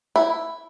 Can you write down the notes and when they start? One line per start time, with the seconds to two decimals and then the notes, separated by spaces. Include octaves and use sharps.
0.16 E4